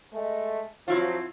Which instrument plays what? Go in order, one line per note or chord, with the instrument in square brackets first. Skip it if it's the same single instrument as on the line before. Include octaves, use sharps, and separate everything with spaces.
[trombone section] G#3 A3
[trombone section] F3 F#3 [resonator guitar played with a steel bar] C4 E4 F4